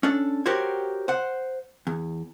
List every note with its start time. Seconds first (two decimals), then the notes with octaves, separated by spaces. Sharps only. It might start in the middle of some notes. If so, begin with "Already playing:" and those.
0.03 C#4 D4 A4
0.46 F#4 G4 A#4 C5 C#5
1.08 C5 F#5
1.87 E2